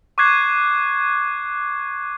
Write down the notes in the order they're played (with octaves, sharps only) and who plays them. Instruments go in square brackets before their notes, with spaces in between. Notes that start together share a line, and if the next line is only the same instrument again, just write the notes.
[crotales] C#6 D6 F#6 G#6 C7 D#7